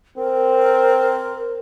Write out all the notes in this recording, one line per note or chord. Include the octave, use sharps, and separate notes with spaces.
C4 A#4